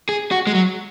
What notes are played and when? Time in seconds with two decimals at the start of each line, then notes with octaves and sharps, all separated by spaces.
0.09 G#4
0.31 F#4
0.47 G#3
0.55 F#3